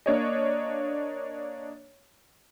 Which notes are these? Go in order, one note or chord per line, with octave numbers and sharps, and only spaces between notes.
A#3 D4 C#5 D#5